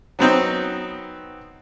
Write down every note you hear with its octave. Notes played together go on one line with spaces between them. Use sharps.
F#3 B3 C4 D#4